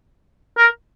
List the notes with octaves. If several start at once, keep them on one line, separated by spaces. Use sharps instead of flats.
A#4